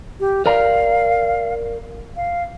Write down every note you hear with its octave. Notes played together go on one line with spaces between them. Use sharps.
G4
A#4 D5 F5 A#5
F5